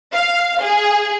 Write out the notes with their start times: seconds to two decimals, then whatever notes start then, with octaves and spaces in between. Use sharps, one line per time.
0.13 F5
0.62 G#4